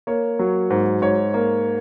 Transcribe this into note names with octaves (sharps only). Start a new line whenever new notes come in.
A#3 C#5
F#3
G#2
G#2 C#5
A#3